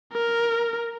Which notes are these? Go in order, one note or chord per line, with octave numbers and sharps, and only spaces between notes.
A#4